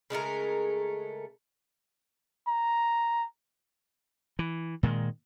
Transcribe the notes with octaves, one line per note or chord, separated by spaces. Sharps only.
C#3 G#3 A3 A#4
A#5
E3
A#2 D#3 G#3